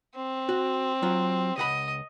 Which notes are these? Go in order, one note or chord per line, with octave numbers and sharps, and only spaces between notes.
C4
F#4
F#3 F4
C#2 D#5 F#5 B5